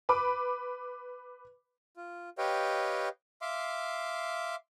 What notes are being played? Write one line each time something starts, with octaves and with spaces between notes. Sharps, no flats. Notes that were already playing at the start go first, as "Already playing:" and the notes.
B4 B5 D6
F4
G4 B4 C#5 D#5 F5 G5
E5 F5 C6 D6